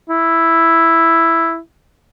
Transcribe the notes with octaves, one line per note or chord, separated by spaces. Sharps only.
E4